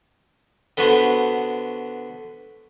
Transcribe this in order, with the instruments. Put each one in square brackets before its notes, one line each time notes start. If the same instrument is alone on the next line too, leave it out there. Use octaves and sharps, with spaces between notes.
[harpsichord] D3 B3 F#4 C5